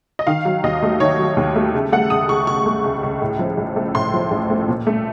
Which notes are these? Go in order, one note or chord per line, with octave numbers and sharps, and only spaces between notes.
D#5
D#3 F5
F#3
D#2 D#5
A3
D#3 C#5
F#3
D#2
A3
C#3
A3 F#5
C#2 D#6
C#2 C#6
C#3 C#6
A3
C#2
C#2
A2
F3
A1
A3
A2 C6
F3
A1
A3
A#2
A3